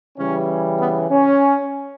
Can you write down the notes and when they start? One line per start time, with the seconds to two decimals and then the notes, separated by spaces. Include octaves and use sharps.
0.18 C#3 E3 G3 C#4
0.79 B3
1.10 C#4